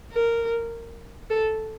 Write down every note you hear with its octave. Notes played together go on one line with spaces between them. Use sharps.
A#4
A4